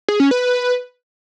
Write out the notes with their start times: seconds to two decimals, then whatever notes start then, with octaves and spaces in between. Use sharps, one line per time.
0.08 G#4
0.20 C#4
0.31 B4